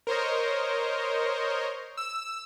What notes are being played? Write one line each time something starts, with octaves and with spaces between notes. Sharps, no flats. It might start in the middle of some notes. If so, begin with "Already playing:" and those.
A#4 C5 C#5 D#5
E6